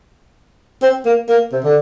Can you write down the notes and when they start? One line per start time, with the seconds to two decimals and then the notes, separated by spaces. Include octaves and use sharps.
0.83 C4
1.06 A#3
1.29 A#3
1.52 C3
1.64 D3